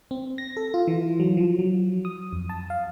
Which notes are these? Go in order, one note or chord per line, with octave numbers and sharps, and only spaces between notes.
C4
A#6
A4
F4
E3
F#3
F3
F#3
D#6
F2
A5
F5